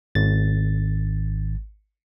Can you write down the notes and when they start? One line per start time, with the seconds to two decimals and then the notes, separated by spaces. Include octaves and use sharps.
0.15 G#1 A6